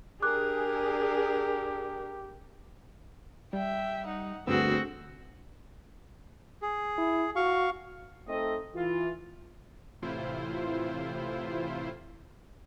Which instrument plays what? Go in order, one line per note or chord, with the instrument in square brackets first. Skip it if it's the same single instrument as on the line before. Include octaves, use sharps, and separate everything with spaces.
[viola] D4 A#4 [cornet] G4 [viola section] G#4 [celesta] D6 F#6
[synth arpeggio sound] G3 [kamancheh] E5 G5
[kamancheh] D#4 F#5
[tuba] D2 [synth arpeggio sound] G2 B3 [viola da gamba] C4 F#4 [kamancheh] G#4 E6
[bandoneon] G#4
[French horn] E4
[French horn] F#4 [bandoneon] F5 C#6
[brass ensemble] A3 C4 D#4 A4 C5 D#5
E3 F4
[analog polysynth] A2 C3 E3 E4 F4 C5